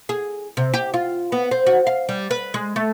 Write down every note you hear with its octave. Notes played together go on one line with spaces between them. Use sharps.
G#4
C3
G4
F4
B3
C4
F#4
F5
G3
B4
G#3
A3